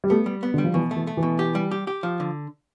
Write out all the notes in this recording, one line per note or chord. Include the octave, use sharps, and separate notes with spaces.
G3
A3 B3
G3
B3
D3
G3
F3
B2 E3
A3
E3
A3
E3
B2
G4
G3
G4
G4
F3
D3